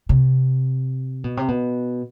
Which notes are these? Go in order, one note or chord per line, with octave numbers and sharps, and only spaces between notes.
C3
B2
C3
B2